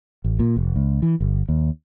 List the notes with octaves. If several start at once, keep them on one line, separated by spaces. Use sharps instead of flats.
A1
A#2
F1
C#2
E3
G1
D#2